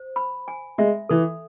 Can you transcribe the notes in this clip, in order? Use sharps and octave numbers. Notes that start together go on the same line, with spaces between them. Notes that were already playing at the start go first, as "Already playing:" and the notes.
Already playing: C5
B5
G#5
G#3 E5
E3 A4